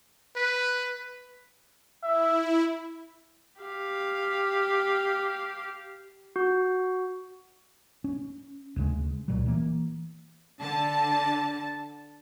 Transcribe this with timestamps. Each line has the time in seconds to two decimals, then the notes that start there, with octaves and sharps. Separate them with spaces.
0.36 B4
2.03 E4 E5
3.61 G4 F5
6.36 F#4
8.04 C#4
8.76 D2 C#3 G#3
9.28 C#2 A#2 F#3
9.46 E3 A#3
10.59 D3 A5